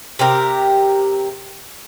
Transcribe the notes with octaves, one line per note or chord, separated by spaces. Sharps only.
C3 G4 A#4